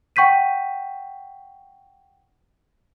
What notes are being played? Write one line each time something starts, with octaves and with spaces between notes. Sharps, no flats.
F#5 G5 C#6 G6 B6 D#7